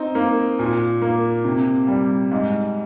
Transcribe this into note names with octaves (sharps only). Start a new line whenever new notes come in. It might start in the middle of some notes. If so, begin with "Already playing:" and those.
Already playing: C4 D#4
A#3
A#2
A#3
C3
G3
G#2